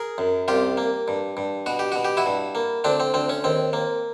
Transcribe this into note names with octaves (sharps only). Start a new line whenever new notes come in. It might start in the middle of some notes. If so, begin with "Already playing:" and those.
Already playing: G#4 A#4
F#2
C2 F4 G4
A#3
G2
G2
B2 F#4
G4
B2 F#4
G4
E4 F#4
G2
A#3
D2 C4 D4
C4
D2 C4
C#4
D#2 C4
A#3